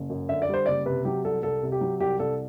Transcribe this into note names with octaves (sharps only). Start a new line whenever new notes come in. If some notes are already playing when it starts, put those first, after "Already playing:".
Already playing: F#1
F#2
D3 E5
D5
G3 C5
F#1 D5
C3 B4
F#3 G4
C2 A4
C2 A4
C3
G4
F#3
C2 G4
C2 A4